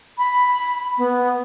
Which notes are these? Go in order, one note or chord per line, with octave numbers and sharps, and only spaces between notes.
B5
B3